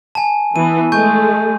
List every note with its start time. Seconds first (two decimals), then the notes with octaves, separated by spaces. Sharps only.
0.15 G#5 A5
0.56 E3 B3 D#7
0.92 G#3 A3 G#5 C#6 G6